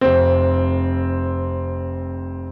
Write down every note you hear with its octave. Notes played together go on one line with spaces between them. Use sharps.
F1 C4